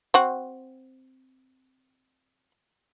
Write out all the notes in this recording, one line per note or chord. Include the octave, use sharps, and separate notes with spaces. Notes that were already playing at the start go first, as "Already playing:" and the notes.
C4 F#4